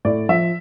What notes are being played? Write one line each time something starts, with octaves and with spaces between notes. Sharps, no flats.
A2 D5
F3 E5